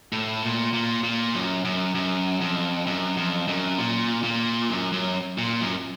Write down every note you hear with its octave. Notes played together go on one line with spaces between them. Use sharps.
A2
A#2
A#2
A#2
F#2
F#2
F#2
F2
F#2
F2
F#2
A#2
A#2
F#2
F#2
A#2
F#2